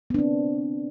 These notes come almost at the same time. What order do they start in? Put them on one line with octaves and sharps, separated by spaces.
B3 D4 C4